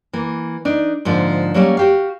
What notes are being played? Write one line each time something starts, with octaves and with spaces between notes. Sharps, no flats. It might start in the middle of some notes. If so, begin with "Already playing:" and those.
E3 A#3
D4 D#4
G#2 D3 F3 A#3
F#3 G3 A#3 C4 C#4
F#4 G4 F5